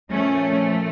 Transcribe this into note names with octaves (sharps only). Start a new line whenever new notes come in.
A#2 F3 A3 C#4